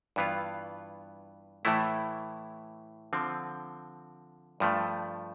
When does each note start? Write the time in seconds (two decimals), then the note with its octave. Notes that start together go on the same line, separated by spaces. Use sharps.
0.16 G2 E3 B3 F4
1.65 A2 E3 A3 E4
3.13 D3 F3 C4
4.60 G2 F3 A3